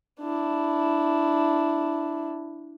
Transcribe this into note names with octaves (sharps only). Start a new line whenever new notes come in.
D4 E4